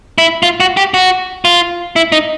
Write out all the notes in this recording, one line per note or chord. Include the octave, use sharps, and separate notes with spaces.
E4
F4
F#4
G4
F#4
F4
E4
D#4